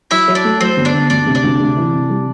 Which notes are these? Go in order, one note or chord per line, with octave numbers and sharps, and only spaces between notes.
F#3 E4 E5
F#3
D4 D5
A3
F#3 C4 C5
G1
D4 D5
G1
D2 D4 D5
C3
D4 D5
D2
C3
E3
C3
G3